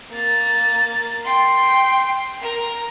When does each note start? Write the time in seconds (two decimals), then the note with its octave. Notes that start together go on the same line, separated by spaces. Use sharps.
0.11 A#3 A6
1.24 G5 C6
2.41 A#4